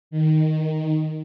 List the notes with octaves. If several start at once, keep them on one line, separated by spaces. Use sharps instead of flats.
D#3